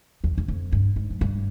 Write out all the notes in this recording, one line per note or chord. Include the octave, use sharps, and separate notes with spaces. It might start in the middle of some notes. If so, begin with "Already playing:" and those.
E2
E2
F2
G2
G#2
F#2
G2